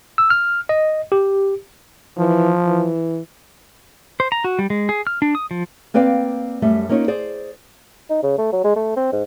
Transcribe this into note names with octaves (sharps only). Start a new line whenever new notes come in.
E6
F6
D#5
G4
E3 F3
E3
C5
A#5
F#4
G3
G#3
G#4
F6
D4
D#6
F3
A#3 C4 B4 D5 F5 G5
F#2 G3 A3 E5
A#3 C#4 D#4 F4 C#5
G#4 C5 D5
D#4
C#3
A3
F#3
G#3
A3
C4
G#2